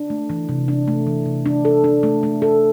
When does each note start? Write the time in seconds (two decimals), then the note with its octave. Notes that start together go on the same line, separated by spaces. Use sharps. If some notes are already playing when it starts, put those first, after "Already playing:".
Already playing: D4
0.10 A3
0.30 E3
0.49 C3
0.68 D4
0.88 A3
1.07 E3
1.26 C3
1.46 D4
1.65 A4
1.84 D4
2.03 A3
2.23 A3
2.42 A4